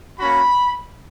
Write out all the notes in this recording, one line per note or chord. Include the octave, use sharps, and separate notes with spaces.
A#3 C#4 F#4 B5